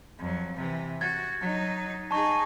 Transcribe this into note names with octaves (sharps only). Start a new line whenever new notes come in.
F2 F#3
C3 E3
F#4 G#6 A6
F#3 D#4
D#4 G#4 A5 C#6